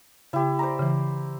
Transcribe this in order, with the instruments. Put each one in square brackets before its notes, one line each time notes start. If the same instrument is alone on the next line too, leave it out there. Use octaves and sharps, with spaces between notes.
[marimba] C#3 [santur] E4 G4
[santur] C5 D5 A#5
[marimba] C#3 E3